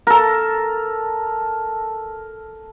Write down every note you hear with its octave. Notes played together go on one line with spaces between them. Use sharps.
A4 A#4